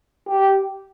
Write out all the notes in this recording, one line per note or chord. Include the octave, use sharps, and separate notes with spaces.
G4